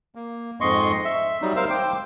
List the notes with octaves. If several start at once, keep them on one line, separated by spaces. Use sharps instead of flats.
A#3
F2 G#2 D#5 C6 C#6
E5
F#3 G3 D#4
A#4 C5 F5 E6
C5 G5 D6